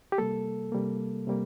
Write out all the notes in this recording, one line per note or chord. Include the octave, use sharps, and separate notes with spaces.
G4
C3 G3 A#3 A4
C3 G3 A#3
C3 G3 A#3